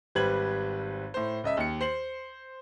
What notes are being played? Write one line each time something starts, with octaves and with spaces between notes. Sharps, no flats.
G#1 G3 B4 C5 G#6 F#7
A2 C5
C#2 D#5 E5
D#2 C#7
C5 C7 F#7